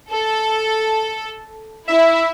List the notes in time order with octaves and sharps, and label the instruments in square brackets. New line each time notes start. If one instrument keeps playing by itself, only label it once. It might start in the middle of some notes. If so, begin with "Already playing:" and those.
[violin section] A4
[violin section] E4 [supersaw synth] E5